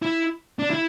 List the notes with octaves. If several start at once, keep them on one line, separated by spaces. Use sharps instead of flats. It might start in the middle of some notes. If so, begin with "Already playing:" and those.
E4
D4
E4